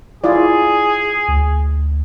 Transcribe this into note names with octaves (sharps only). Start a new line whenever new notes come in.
E4 F4 G#4 D5
D2